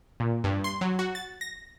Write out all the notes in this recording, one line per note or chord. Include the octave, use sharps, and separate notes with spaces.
A#2
G2
C6
F#3
F#4
A6
A#6